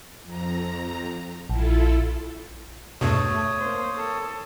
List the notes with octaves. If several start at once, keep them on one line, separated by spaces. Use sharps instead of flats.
F2 A#5
A#1 E4 F4 A4
E2 G2 B2 A3 C#5 D#6
A#3 C5
A4